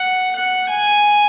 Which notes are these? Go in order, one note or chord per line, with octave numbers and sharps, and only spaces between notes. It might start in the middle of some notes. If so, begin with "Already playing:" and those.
Already playing: F#5
F#5
G#5